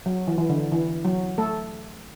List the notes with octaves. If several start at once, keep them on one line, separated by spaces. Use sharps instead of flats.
F#3
E3
E3
D3
E3
F#3
A3 A4